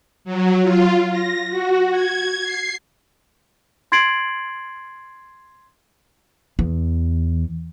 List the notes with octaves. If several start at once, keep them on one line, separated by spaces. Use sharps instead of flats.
F#3
F4
A#6
F#4
G#6
C7
C6 G#6 A6 C7 D7 F#7
E2